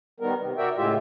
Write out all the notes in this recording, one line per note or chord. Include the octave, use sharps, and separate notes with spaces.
D#3 G3 B3 A#4
C3
F#4 A#4 D5 E5 G5
A2 C#3 G#3 F4 G4 E5